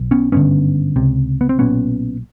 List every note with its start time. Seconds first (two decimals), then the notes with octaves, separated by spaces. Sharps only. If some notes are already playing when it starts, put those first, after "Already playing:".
Already playing: B1
0.11 B3 C#4
0.32 G#1 G2 D3 B3 C#4
0.96 C#2 C3
1.41 B3
1.49 C4
1.59 B1 A#2 B3 C#4